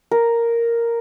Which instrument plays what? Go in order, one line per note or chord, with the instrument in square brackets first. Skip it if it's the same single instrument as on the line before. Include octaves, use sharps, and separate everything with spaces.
[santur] A#4